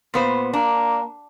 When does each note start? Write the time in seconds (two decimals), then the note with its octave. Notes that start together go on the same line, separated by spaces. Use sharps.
0.14 A#2 B3 C5
0.53 A#3 D4